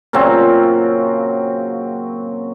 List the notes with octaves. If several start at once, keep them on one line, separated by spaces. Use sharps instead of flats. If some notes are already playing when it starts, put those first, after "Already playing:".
A#2 C#3 F#3 C4